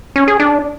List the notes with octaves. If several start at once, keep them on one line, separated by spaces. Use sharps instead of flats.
C#4
G#4
D4